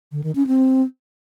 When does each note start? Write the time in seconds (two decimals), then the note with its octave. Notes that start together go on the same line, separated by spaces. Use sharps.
0.12 D3
0.24 D#3
0.35 C#4
0.47 C4